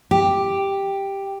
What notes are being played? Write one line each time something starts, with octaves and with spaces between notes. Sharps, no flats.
G4